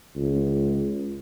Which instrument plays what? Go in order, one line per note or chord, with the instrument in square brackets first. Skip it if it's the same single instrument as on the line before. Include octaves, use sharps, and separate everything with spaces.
[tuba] C#2